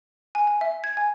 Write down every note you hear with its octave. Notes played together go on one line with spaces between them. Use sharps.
G#5
G#5
E5
G#6
G#5